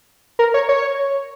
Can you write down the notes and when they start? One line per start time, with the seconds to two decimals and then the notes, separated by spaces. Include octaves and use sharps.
0.39 A#4
0.54 C#5
0.69 C#5